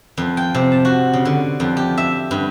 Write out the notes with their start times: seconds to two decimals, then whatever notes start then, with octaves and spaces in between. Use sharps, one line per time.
0.18 F2
0.37 G5
0.55 C3
0.72 A5
0.85 F#4
1.13 C#3
1.25 D3
1.60 F2
1.77 G4
1.97 E5
2.31 G2